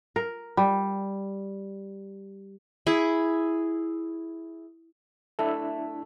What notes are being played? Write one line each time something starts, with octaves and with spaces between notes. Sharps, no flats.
A#4
G3
E4 G#4
A3 D4 E4 A4